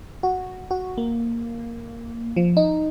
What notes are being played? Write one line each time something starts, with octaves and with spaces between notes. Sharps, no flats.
F#4
F#4
A#3
F3
D#4